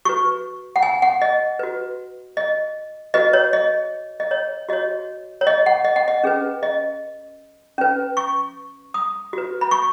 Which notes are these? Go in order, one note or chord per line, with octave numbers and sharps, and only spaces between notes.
F#4 B4 C#6
F#5
G#5
F#5
D#5
F#4 B4
D#5
F#4 B4 D#5
C#5
D#5
D#5
C#5
F#4 C#5 D#5
C#5
D#5
F#5
D#5
F#5
D#5
C#4 G#4 B4
D#5
C#4 B4
C#6
D#6
F#4 B4
B5
C#6